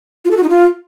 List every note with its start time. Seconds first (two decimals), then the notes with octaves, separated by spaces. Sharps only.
0.25 F4
0.31 A4
0.37 F#4
0.43 D#4
0.49 F4